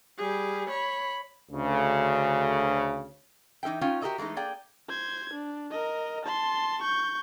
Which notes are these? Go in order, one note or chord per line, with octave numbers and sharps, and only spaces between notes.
G3 G#4
C#5 B5
D2 C#3
E3 D#4 A4 E5 G5
C#4 D#4 F4 G5
F#4 G4 A4 A#4 D#5 E5
E3 G#3 A3 D#4
A#3 G#4 D5 G5
C5 G#6
D4
A#4 D#5
A5 C6
C#6 G6